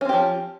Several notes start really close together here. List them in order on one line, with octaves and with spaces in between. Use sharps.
C#4 C4 G4 F3